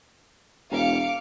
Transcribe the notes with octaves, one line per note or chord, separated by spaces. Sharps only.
E1 F5 D6 C#7